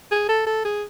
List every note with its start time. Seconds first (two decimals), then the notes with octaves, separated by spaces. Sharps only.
0.12 G#4
0.29 A4
0.47 A4
0.65 G#4